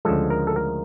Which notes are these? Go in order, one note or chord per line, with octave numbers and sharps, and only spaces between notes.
D2 C#3 F3 G#3 A4
A#4
A4
A#4